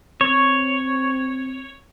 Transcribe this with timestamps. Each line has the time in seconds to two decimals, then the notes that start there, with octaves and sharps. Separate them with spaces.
0.21 C4 C#5